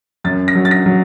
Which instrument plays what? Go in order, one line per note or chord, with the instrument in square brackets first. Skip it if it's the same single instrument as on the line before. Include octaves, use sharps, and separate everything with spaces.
[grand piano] F#2 A6
A#6
F#3
A6
A#6
F#3